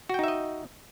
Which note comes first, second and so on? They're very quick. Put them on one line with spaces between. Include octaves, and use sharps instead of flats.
F#4 G5 D#4 E5 D#5